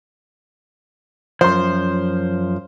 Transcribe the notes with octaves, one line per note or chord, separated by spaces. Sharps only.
F#2 F3 C5 C6